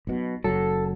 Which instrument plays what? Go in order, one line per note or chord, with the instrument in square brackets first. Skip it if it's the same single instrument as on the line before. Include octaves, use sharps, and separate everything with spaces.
[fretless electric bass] B1 B2
[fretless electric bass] F#1 F#3 [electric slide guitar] A4